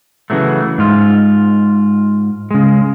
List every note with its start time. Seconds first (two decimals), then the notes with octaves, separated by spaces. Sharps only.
0.30 C#3 E3 F#3 A3
0.78 G#2 F4
2.51 C#3 G#3